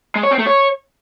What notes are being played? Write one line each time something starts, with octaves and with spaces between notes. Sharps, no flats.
G#3
C#5
C4
A3
C#5